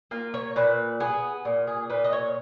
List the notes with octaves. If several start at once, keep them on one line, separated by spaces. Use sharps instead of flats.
A#3 F4
C#5
A#2 B4
B3 G#4
A#2
G#4
A#2 B4
D#5
C#5